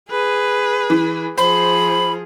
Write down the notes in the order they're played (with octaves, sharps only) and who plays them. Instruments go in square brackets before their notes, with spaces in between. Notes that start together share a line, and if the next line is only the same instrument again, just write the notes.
[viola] G#4 B4
[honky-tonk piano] E3
[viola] F3 G#4 [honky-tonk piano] C5 [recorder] B5